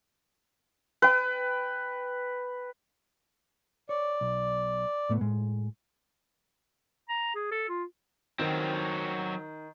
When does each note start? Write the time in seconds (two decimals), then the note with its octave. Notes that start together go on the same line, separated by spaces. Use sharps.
1.02 B4 G5
3.89 C#5 D5
4.21 B1
5.09 A2 A3 B3
5.21 A2 G#3
7.09 A#5
7.35 G#4
7.51 A4
7.69 F4
8.39 D#3 F#3 C4